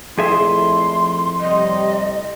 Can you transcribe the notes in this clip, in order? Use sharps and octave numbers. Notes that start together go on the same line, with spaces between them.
F2 A#2 A3 E4 G#4 E5 C6
A2 C3 G3 D#5